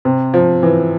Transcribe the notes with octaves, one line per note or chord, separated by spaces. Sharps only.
C3
F3
E3